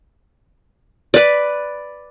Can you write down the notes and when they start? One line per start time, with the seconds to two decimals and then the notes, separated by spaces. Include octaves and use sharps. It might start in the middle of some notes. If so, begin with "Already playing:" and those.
1.14 B4 D5